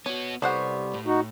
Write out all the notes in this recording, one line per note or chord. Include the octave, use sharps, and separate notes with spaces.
B3 F#4 C#5
C2 G3 B3 A4 C5 C#5 F#5
A2
D#4 F#4